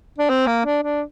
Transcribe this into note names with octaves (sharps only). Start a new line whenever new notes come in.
D4
C4
A#3
D4
D4